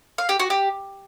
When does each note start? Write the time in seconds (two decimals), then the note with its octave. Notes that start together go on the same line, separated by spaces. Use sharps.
0.18 F5
0.29 G4
0.40 F#4
0.50 G4